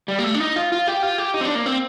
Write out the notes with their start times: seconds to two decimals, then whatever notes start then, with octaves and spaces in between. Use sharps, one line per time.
0.08 G3
0.19 A#3
0.24 A3
0.35 D4
0.40 D#4
0.56 F4
0.72 F4
0.88 G4
1.03 F4
1.18 G4
1.34 D#4
1.41 C4
1.45 D4
1.55 A#3
1.66 C4